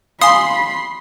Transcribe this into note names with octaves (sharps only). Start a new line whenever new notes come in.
F5 G#5 B5 C6 D#6 C7